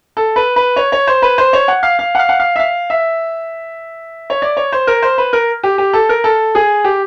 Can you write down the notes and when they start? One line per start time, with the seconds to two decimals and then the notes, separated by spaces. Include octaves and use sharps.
0.17 A4
0.36 B4
0.56 B4
0.76 C#5
0.92 C#5
1.07 C5
1.22 B4
1.38 C5
1.53 C#5
1.68 F#5
1.83 F5
1.99 F5
2.15 F#5
2.19 F5
2.29 F#5
2.40 F5
2.56 E5
2.59 F5
2.90 E5
4.30 C#5
4.42 D5
4.57 C#5
4.72 C5
4.87 A#4
5.03 C5
5.18 B4
5.33 A#4
5.63 G4
5.78 G4
5.93 A4
6.09 A#4
6.24 A4
6.55 G#4
6.84 G4